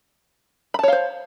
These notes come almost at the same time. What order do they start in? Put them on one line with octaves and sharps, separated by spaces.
B5 A5 C#5 F5 C5